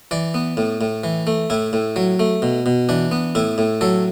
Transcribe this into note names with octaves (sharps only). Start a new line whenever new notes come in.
E3 D5
B3
A2
A2
E3
A3
A2 E4
A2
F#3
A3
B2
B2
E3 D4
B3
A2 E4
A2
F#3 A4